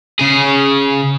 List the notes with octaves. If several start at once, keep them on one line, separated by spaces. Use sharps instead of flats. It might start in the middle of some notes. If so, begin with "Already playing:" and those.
C#3 G#4